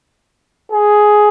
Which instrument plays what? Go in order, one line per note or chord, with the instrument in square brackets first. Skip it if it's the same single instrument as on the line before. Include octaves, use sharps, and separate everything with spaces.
[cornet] G#4